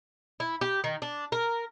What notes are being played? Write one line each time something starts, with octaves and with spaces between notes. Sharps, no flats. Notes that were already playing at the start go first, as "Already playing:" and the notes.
E4
G4
D#3
D4
A#4